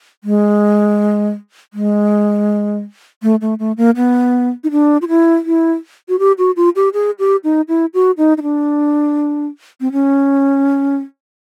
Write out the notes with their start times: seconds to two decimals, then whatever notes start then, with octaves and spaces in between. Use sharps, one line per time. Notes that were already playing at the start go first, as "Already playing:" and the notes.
0.24 G#3
1.74 G#3
3.23 A3
3.41 A3
3.59 A3
3.77 A#3
3.96 B3
4.64 D#4
4.71 D4
5.02 F4
5.08 E4
5.46 E4
6.09 F#4
6.19 G4
6.38 F#4
6.56 F4
6.76 G4
6.94 G#4
7.19 G4
7.44 D#4
7.68 E4
7.94 F#4
8.18 D#4
8.38 D#4
8.43 D4
9.81 C4
9.92 C#4